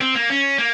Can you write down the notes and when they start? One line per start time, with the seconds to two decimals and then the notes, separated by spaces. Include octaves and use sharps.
0.01 C4
0.15 A#3
0.30 C#4
0.58 A#3